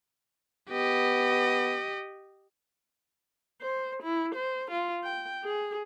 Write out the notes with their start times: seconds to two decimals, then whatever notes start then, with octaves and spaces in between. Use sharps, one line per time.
0.71 B3 G4 D#5
3.62 C5
4.03 E4
4.35 C5
4.71 F4
5.04 G5
5.44 G#4